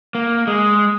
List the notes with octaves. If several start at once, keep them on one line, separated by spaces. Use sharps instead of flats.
A#3
G#3